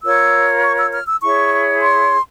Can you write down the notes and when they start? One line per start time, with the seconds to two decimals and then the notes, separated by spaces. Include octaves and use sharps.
0.03 F4 A#4 C#5 E6
0.63 C#6
0.77 E6
0.92 F6
1.07 E6
1.21 E4 G#4 C#5 C#6
1.81 C6